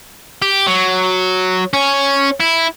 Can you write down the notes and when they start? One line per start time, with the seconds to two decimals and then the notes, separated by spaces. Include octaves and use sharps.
0.42 G4
0.67 F#3
1.73 C#4
2.40 E4